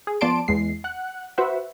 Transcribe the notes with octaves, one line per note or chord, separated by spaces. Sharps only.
G#4
F3 B3 D5 A5 C6 D7
E2 G#3 C7
F#5 F#6
F#4 B4 C5 E5 F#5